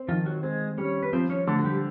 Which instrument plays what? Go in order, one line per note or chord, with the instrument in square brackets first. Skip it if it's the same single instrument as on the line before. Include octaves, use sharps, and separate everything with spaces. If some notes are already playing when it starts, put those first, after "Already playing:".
Already playing: [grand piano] C4
[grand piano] D#3 [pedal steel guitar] F3 F4
[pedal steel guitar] F#3 F#4
[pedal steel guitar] G#3 G#4 [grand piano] C4
[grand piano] G3 [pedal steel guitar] C#4 C#5
[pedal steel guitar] B4
[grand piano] F3 [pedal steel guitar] C4 C5
[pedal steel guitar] C#4 C#5
[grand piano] D3 [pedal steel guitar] A3 A4
[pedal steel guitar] F#4
G3 G4